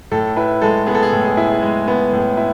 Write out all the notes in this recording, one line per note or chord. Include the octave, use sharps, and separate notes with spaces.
A2 A4
E4 B4
G#3 A4
B3 G#4
A4
G#4
A2
G#4
E4
G#4
G#3
B3
A2
E4